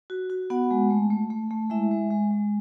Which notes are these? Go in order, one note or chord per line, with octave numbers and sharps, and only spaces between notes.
F#4
F#4
B3 F#4 F#5
G#3
A3
A3
A3
A3
G#3 E4 E5
G#3
G#3
G#3